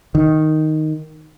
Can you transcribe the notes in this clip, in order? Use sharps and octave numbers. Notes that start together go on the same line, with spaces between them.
D#3